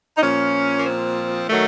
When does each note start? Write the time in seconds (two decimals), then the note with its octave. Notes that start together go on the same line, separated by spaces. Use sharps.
0.17 D#4
0.22 A#2 F3 C#4
0.78 A#3
0.85 C4
1.49 D#3 F#3 A3